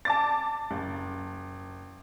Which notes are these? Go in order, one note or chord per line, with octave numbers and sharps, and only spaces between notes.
A5 D6 A6
F#1